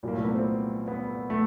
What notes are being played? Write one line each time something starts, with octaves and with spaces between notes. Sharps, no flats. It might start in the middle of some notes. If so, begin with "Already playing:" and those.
C2 A#2 F#3 A#3
A3
B3
C4
B3
A3